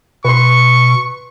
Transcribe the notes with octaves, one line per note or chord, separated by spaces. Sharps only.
B2 B4 C6 C#6